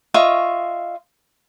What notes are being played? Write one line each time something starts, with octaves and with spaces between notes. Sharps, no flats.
F4 D#5 E5 C#6